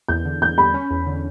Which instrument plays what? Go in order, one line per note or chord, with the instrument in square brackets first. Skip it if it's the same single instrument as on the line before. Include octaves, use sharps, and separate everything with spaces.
[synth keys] E2 [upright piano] G6
[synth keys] D3
[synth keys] E2 [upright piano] G6
[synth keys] G3 [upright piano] B5
[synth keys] C#4
E2
D3